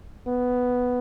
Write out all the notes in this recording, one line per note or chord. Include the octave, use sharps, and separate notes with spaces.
B3